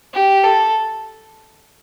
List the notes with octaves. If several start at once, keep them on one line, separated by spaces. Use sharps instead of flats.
G4
A4